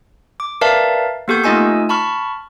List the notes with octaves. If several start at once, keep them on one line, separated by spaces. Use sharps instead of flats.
D6
A#4 B4 D5 E5 F5 A5
A#3 B3 G4 A4 C#6 G6
A3 D#4 F4 D#5 G#5 E6
A5 B5 C#6 F6